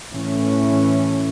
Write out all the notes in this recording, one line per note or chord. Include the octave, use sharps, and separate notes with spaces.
A2 E3 A3 C#4